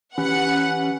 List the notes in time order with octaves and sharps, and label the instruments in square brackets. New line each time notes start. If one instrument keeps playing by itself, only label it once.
[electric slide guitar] E3 G4 [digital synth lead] C#4 [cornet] B4 [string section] F#5